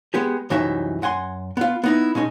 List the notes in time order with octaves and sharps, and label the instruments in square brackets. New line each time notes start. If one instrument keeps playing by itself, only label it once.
[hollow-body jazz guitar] G#3 B3 G4 G#4
C2 F#2 E3 D#4 C#5 E5
F#2 F#5 G#5 C6
B3 F4
B3 D#4 E4
B2 G#3 C#4 D#4